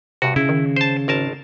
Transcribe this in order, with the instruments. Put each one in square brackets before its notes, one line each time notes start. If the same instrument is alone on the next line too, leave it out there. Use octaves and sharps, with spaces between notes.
[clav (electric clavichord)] G2 F#4 [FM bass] C3
[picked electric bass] C#3 [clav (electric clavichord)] E4
[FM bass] D#3
[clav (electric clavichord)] C5 A5
G#1 A#4 A5